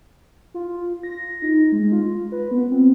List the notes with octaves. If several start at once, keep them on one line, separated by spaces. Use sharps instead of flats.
F4
A#6
D#4
G#3
F4
B4
B3
C4